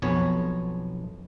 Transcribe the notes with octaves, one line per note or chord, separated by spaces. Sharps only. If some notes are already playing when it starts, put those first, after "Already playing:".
B1 F2 B3 C#5 G#5